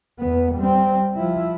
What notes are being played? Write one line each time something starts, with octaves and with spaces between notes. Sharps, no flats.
E2 B3
G3 C4
F3 E4